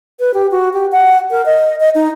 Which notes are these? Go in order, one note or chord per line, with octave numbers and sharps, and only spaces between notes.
B4
G4
F#4
G4
F#5
A#4
D#5
D#5
D#4